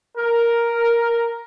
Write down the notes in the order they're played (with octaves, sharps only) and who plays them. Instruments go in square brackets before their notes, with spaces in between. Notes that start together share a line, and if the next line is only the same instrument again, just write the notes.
[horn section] A#4